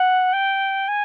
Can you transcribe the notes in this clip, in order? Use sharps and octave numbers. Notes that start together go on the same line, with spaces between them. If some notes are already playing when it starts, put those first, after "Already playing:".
Already playing: F#5
G5
G#5